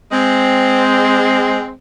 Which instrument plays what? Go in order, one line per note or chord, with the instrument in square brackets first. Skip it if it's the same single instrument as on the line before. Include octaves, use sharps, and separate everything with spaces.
[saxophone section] G#3 C4